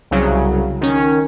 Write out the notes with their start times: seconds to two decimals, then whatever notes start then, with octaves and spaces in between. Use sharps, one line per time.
0.11 C2 C#3 F#3
0.81 D#3 C#4